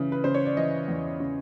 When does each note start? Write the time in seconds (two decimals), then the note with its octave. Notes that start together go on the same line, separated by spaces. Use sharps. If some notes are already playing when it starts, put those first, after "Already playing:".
Already playing: C#3 E3
0.12 B4
0.24 C#3 C5
0.34 C#5
0.45 D5
0.57 E3 D#5
0.88 E2
1.20 C#3